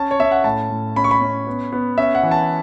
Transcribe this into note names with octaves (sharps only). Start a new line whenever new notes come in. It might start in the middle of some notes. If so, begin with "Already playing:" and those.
Already playing: C#4 A5
C#5
C#4 E5
F#5
A2 A5
A2
C#4 B5
C#6
B5
C#4
B3
B3
C#4 E5
F#5
E3
A5